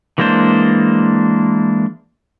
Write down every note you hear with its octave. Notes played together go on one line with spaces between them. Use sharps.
E3 G#3 A#3 D4 C5